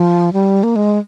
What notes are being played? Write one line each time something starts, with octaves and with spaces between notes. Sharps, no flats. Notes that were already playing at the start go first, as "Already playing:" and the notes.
Already playing: F3
G3
A#3
G#3